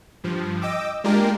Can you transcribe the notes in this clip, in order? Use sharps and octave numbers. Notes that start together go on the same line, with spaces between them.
G2 F3
D#5 G5 D6 E6
G#3 A#3 D4 F4 G4 A#4